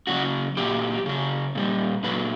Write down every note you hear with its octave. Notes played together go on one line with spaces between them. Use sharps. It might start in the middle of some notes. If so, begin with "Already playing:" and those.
C#3 F#3 F#4
A#2 F#3 G4
C#3 F#3
A#2 G3
A#2 F#3 B4